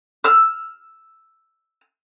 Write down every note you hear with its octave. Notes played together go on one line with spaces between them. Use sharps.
E6 F6